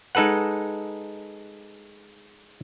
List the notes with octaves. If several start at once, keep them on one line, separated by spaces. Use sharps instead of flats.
G#3 D#4 A4 B4 F#5